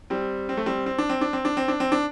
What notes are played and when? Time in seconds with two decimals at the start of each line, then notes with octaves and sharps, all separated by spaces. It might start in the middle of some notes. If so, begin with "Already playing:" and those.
0.10 G3 C4
0.49 C4
0.57 A3
0.66 G3 C4
0.86 C4
0.98 D4
1.10 C4
1.21 D4
1.33 C4
1.45 D4
1.57 C4
1.68 D4
1.80 C4
1.92 D4